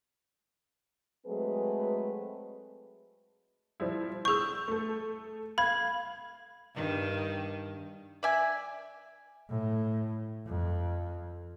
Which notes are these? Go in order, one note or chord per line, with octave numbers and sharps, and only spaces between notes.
F#3 G#3 A3 C4 G#4 B4
F3 G3 E4
G#4 C#6 E6 G6
A3 A4
F5 B5 G#6
G2 D#3
D5 E5 G#5
A2
F2